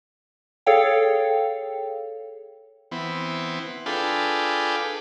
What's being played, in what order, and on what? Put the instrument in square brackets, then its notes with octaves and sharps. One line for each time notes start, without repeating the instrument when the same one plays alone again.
[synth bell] G#4 A4 C#5 F5 G5
[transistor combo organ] E3 B3 C4
D4 F4 G#4 A4 B4 G5